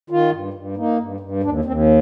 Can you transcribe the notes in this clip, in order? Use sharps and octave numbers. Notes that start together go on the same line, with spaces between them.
D#3 F4
G2
G2
A#3 D#4
G2
G2
D#2 D4
D#2 C4